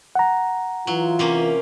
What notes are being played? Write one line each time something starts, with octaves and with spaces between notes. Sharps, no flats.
F#5 A#5
E3 F#3 F4
C3 A#3 C#4